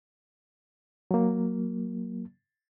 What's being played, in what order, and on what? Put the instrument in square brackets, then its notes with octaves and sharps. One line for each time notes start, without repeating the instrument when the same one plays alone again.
[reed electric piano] F#3 A#3